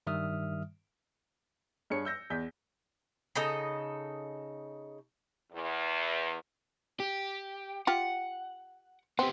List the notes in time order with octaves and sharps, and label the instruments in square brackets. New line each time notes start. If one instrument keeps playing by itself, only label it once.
[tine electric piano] G2 D#3 G3 E5 D#6 F6
[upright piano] G2 G#4 C#5 C#7
E6 G6 A#6
E2 G6 B6
[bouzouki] C#3 D#4 A4 D#5
[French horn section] E2
[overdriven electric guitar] G4
[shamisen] F4 G4 [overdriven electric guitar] F#5
[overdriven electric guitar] B3 G4 [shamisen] C4